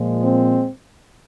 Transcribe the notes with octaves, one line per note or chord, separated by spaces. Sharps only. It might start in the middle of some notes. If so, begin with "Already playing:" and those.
Already playing: A#2 F3 G#3
C4